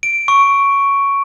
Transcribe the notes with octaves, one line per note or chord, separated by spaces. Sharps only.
D7
C#6